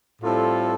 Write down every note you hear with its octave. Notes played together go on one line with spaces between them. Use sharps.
A2 G3 C4 F4 A4